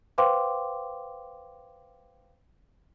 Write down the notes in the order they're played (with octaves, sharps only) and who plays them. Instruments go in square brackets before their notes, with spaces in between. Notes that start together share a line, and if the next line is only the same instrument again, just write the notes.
[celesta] B4 C5 F5 G5 C6 D6